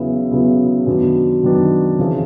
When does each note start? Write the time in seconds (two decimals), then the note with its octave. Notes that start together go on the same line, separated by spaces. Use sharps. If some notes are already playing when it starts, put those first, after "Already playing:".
Already playing: E2 C#3 F#3 B3 E4
0.31 E2 C#3 F#3 B3 E4
0.86 F#2 D#3 F#3 B3 D4
1.43 F#2 D#3 F#3 B3 D4
1.99 F2 C#3 E3